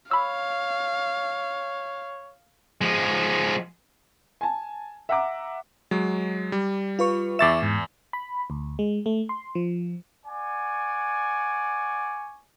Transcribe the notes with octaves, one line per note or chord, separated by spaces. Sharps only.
C#5 F5 B5 E6
F3 G#3
G#5 A5
E5 F#5 A#5 D6
F#3 G#3
G3
F4 B4 C#6
E2 E5 C#6 D6 A6 E7
G#2
B5
D2
G#3
A3
C6
F3
D5 F#5 G#5 C#6